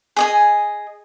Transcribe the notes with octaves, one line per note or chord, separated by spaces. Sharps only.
G#4 D#5 G#5